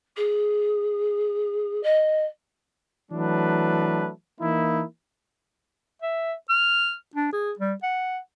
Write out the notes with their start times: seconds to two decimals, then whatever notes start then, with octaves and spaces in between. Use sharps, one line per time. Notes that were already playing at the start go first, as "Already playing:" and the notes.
0.16 G#4
1.83 D#5
3.12 E3 F#3 A3 D4 B4
4.40 E3 A#3 D#4 E4
6.02 E5
6.50 F6
7.16 D4
7.33 G#4
7.59 G3
7.83 F#5